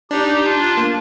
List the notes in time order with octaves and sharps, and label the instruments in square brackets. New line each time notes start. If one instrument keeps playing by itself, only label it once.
[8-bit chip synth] D4 [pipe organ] D#4 G4
[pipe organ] D4 F4
[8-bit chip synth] A#3